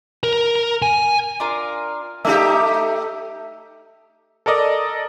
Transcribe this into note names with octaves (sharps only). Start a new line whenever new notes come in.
A#4
G#5
D4 F4 A#4
A3 D#4 G4 E5
A4 A#4 D5 D#5